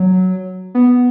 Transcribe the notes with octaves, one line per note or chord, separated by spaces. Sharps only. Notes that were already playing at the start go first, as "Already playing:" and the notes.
Already playing: F#3
B3